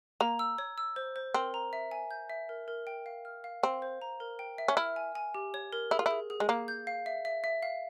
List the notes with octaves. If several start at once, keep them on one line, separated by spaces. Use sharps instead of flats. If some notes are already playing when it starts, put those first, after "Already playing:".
A#3 A#5
E6
C#5
E6
C5
C5
C4 A#4
A#5
E5
G#5
G6
E5
A#4
A#4
G5
F5
F6
F5
C4 F5
C5
A#5
A#4
G5
E5
C#4
E4 F6
G#5
G#5
G4
C#5
A#4
E4 G#4
F4
E4 G#4
G#4
G#3
A#3 F5
G6
F5
E5
E5
E5
F5